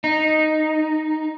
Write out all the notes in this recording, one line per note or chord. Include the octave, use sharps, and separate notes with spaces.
D#4